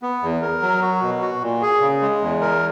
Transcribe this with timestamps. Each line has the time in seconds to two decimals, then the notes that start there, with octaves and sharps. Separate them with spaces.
0.02 B3
0.22 E2
0.42 A#4
0.62 F#3
0.82 F#4
1.02 B2
1.22 F#4
1.42 A#2
1.62 G#4
1.82 C#3
2.02 G#3
2.21 E2
2.41 A#4